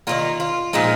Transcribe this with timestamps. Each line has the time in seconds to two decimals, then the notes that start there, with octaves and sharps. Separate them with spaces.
0.07 D#3 F#3 A#3 F4
0.40 F4
0.73 A#2 F3 G#3 D#4